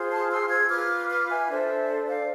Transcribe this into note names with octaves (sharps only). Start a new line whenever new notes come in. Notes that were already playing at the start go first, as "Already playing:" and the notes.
Already playing: F4 G#4 C5
A5 C6
C6 E6
E6 G#6
F4 B4 D6 F6
D6 F6
E5 G#5
D4 A4 C5 E5
D5 F5